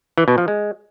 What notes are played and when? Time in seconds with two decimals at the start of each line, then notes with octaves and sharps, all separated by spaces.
0.18 E3
0.28 B2
0.38 F3
0.48 G#3